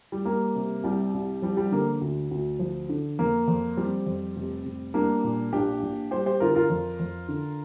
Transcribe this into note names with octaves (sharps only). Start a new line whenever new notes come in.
G3
G3 A#3
C3
C2 G3
C2
F3 G3
G3
D3 A#3
D2
D2
F3
D3
F2 A#3
F2
F3 G3 C4
F2
F1
F1
G3 A#3 D4
A#2
A#1 D4 G4
A#1
G3 G4 C5
G4 C5
D3 F4 A#4
F4 A#4
F2
F2
D3